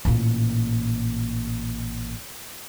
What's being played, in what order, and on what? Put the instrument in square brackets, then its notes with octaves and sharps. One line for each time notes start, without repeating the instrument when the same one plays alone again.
[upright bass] A1 A#2